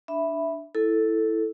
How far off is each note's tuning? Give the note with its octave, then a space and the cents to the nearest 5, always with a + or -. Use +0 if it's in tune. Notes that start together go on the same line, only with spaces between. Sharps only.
D4 +0 E5 +0 B5 +0
E4 +0 A4 +0